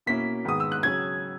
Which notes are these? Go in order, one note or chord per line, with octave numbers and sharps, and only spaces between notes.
B2 A#3 C#4 E4 B6
G#2 D#3 G#3 B3 D#6
E6
F#6
C#3 F#3 C#4 G#6